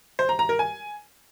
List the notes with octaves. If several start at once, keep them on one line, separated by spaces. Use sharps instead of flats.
C5
A#5
A#5
A#4
G#5